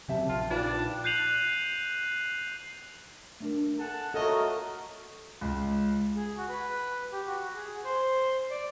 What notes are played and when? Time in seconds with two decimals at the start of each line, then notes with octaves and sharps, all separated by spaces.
0.08 C#3 F#3 C4 G4 E5 A5
0.29 A#1 F4
0.50 D4 D#4 F4 B4 F5 G5
1.04 F#6 G6 C7 D#7 F7 F#7
3.40 A3 D4 A#4
3.79 A4 F#5 G#5 A5
4.14 A3 F4 F#4 A4 A#4 C#5 D#5
5.41 C#2
6.16 G#4
6.37 F#4
6.49 B4
7.12 G4
7.27 F#4
7.55 G#4
7.85 C5
8.51 D5